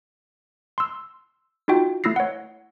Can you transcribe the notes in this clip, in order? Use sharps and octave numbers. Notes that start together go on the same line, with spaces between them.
C6 E6
D#4 F4 F#4 G5
A3 E4 E6 A#6 C7
C#5 F#5